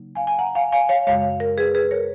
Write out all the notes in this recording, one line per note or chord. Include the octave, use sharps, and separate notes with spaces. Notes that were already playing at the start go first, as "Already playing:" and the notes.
Already playing: C#3 F#3 A#3 D#4
F5 G#5
G#5
F#5 A#5
F5 G#5
F5 G#5
C#5 F5
F#2 C#3 G#3 C#5 F5
A#4
G#4 B4
G#4 B4
A#4 C#5